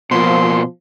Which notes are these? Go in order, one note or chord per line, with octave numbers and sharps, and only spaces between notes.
B2 F3 A#3 C6